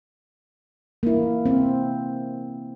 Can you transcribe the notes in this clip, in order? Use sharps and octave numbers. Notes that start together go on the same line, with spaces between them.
A#3 E4
C4